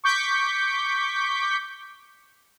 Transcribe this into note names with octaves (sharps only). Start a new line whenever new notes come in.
C#6 D6 G6 B6